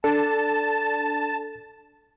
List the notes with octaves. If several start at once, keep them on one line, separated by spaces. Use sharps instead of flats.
D4 A4 A5